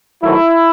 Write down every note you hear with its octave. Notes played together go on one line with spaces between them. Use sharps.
G#2 D#3 F#3 A3 E4